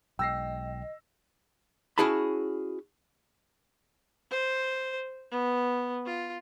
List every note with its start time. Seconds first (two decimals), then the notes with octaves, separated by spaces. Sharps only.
0.19 B1 G#3 D#5 G5 E6 A#6 C7
1.98 C#4 E4 F#4 G#4 A5 B5
4.31 C5
5.31 B3
6.06 F4